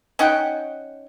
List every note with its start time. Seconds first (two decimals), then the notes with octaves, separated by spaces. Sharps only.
0.19 C#4 D#4 F#5 G5